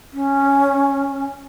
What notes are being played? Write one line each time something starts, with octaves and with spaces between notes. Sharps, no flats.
C#4